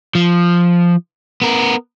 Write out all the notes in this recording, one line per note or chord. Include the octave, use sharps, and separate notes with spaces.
F3
B3 A#4